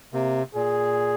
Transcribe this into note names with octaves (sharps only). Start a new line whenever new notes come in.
C3 A#3
A#2 G#4